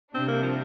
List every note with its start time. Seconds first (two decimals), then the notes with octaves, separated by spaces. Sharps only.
0.14 C3 G3 C4 D4
0.28 A#3
0.43 F3